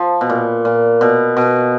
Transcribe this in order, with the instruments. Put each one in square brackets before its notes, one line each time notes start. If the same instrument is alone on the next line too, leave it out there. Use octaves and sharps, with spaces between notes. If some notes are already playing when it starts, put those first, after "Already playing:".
Already playing: [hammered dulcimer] F3
B2
A#2
A#2
B2
B2